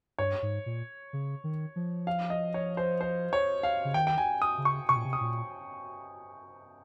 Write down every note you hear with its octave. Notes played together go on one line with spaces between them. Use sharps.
G2 C#5
G#2
A#2
C#3
D#3
F3
F5
D#5
C#5
C5
C5
C#5
F5
C#3
D#3 G5
G5
G#5
D#6
C#3
C#6
C3 C#6
A#2
C3
D#6
A#2